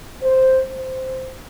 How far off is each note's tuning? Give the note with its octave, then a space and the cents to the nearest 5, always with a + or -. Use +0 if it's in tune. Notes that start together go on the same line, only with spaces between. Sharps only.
C5 +0
C5 -5